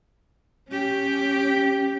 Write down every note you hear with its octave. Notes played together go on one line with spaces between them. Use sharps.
C#4 G4